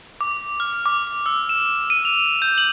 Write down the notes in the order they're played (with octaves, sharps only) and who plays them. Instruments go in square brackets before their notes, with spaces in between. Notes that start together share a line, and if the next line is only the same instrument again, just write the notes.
[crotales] D6
F6
D6
E6
E7
D#7
F7
G6
F#7